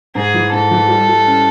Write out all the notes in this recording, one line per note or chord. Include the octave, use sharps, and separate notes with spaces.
G#2 G#4
E3
G#2 A4
E3
G3
G3
C#4